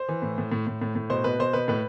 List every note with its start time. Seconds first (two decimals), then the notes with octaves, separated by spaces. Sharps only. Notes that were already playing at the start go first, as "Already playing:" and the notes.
Already playing: C5
0.09 E3
0.22 A2
0.38 A2
0.52 A2
0.67 A2
0.82 A2
0.95 A2
1.10 B2 C5
1.24 B2 B4
1.39 B2 C5
1.53 B2 B4
1.68 A2 B4